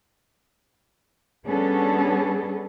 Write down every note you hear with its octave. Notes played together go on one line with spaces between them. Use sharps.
G3 B3 C#4 D4 G#4 A4